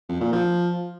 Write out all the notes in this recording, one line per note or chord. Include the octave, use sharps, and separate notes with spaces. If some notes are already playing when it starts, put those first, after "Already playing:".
F2
A#2
F3